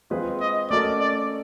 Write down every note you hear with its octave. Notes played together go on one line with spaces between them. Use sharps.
G#3 C4 F4 G#4 B4
D#5
A3 C#4 F#4 A#4 D5 D#5
D5